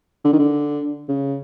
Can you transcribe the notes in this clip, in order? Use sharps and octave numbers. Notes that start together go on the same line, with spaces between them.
D3
D#3
D3
C#3